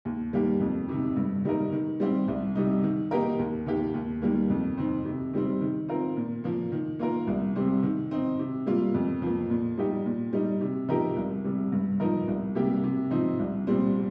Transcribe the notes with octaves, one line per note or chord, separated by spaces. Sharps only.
D#2
D#3 G3 A#3 G4
F2
C3 D#3
G2
D#3 G3 D#4 A#4
D#3
G3 C4 G4
C2
C3 G3 D#4
D#3
A#3 D#4 G4 A#4
D#2
D#3 A#3 G4
D#2
D#3 G3 A#3
F2
D#3 C4
C3
D#3 G3 C4
D#3
C4 F4 A#4
A#2
F3 A#3
D#3
A#3 F4 A#4
C2
C3 G3 C4
D#3
C4 D#4
C3
G3 A#3 F4
F2
F3 A#3
A#2
G3 D#4 G4
A#2
G3 D#4
C3
F3 D#4 G4 A#4
C2
C3 G3
G2
F3 D#4 A#4
C2
C3 G3 A#3 G4
C3
F3 C4 D#4
C2
A#2 G3 C4